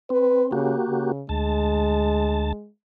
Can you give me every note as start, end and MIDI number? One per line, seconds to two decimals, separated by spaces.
0.10 0.51 60
0.10 0.45 71
0.52 0.74 49
0.52 1.12 58
0.52 1.12 66
0.52 1.12 67
0.89 1.24 49
1.29 2.53 38
1.29 2.69 56
1.29 2.53 81